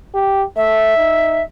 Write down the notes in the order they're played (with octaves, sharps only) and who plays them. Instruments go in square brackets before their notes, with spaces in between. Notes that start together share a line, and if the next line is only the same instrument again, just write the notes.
[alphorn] G4
[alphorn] A3 [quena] E5
[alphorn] D#4